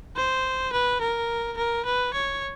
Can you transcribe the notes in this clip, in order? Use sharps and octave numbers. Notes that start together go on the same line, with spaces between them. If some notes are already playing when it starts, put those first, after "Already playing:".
C5
B4
A#4
A#4
B4
C#5